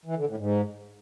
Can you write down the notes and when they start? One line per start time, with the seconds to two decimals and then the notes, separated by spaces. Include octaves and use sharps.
0.05 E3
0.16 D3
0.27 A2
0.37 G#2